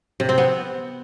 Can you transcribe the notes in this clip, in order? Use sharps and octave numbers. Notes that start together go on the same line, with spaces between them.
C3
C4
B3